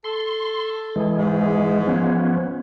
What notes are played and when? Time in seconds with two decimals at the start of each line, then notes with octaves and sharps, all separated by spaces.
0.04 A4 C6
0.96 E3 G#3
1.17 G#2
1.86 F3 B3 C#4